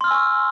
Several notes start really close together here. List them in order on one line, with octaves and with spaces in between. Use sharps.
C6 F6 E6 G#5 C#6